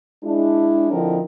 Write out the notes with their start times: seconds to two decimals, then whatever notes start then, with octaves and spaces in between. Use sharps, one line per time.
0.24 G#3 D4 E4
0.91 D3 F3 C4 D#4 E4 A#4